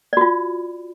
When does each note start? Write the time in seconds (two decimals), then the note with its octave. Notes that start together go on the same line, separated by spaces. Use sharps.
0.13 D5
0.17 F#4
0.21 F4